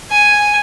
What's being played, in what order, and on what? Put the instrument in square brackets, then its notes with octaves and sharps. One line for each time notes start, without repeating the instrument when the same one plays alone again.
[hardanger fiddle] G#5